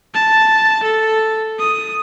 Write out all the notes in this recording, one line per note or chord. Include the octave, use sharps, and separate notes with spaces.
A5
A4
D#6